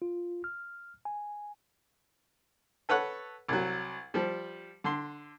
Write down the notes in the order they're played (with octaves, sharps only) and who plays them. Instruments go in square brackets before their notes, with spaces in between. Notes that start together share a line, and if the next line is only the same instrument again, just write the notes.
[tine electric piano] F4
F6
G#5
[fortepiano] A4 B4 C#5 F#5
C2 F#3
F3 G3
D3 C6